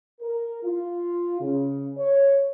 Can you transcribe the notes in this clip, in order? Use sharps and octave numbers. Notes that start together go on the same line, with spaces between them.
A#4
F4
C#3
C#5